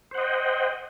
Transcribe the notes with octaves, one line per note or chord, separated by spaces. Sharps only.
C5 D#5 F#5 G5